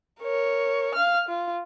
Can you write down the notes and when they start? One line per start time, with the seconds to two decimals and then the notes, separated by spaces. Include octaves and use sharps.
0.21 A#4 C#5
0.95 F5 F6
1.28 F4